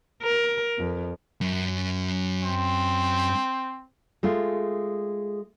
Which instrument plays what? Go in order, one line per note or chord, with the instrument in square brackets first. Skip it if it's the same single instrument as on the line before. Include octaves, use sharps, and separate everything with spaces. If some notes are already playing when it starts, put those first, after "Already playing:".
[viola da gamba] A#4
F2
[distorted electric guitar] F#2
[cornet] C4
[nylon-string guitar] G#3 A3 F4